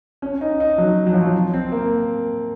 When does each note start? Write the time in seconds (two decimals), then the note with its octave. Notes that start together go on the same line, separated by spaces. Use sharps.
0.22 C#4
0.41 D#4
0.60 D#4
0.78 F#3
1.07 F#3
1.13 F3
1.22 F#3
1.54 C4
1.72 A#3